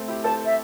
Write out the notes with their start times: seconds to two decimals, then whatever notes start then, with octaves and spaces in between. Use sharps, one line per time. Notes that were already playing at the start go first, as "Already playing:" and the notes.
Already playing: A3 C4
0.08 E4 G4
0.24 A4 C5 A5
0.45 E5